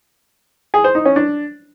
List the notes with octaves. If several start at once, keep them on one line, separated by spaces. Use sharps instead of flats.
G#4
C5
D#4
C#4
D4